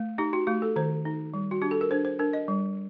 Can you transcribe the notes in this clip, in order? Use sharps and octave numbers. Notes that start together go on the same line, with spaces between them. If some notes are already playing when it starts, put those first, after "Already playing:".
Already playing: A3
D#4 G4
F#4
A3 G4
A4
D#3 C5
D#4
G3
F#4
D4 G4
A4
A#4
D4 C5
C5
D4 A#4
D#5
G3